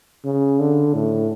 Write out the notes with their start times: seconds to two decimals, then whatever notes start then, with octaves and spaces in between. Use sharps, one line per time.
0.25 C#3
0.59 D3
0.94 A2